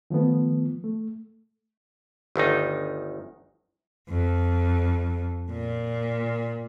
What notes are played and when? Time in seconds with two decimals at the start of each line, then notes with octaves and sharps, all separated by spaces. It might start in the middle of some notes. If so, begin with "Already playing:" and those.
0.10 D#3 F3 A3 B3
0.84 A3
2.36 G1 D2 D#3 D#4
4.09 F2
5.51 A#2